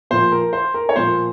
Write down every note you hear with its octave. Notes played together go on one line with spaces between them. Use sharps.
A#2 F3 A#3 C5
A#4
C5
A#4
C#5
A#2 F3 A#3 C5